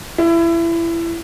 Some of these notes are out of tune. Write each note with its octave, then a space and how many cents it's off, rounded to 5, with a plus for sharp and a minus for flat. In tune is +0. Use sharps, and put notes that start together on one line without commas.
E4 +25